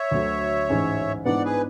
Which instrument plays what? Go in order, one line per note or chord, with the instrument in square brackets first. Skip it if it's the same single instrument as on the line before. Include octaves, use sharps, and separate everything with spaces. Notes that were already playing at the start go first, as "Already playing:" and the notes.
Already playing: [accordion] C#5 E5
[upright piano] D2 D3 F#3 A3
A1 G#2 G#3 C#4
[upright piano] G#2 E3 B3 D4 [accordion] D5 F#5
[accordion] G#4 B4